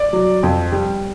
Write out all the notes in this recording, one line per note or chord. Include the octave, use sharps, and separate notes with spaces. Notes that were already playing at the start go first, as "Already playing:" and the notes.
Already playing: D5
F#3
F2
G3